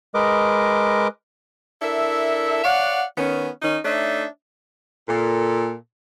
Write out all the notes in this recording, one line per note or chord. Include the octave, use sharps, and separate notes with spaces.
G#3 A#4 B4 D#5 D6
D4 E4 A4 A#4 E5
C#5 D5 F5 F#5
D#3 B3 C#4
D#3 C#4 D#4
A3 D4 D#4 C#5 E5
A#2 A4